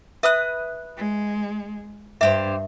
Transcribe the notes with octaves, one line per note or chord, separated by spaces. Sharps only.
B4 E5 D#6 F#6
G#3
G2 D4 G4 C5 E5